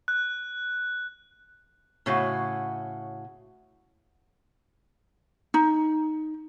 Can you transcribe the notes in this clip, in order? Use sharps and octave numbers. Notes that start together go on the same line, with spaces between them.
F#6
A2 C#3 F#4
D#4